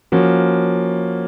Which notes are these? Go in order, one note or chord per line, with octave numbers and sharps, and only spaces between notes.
F3 A#3 C#4 F#4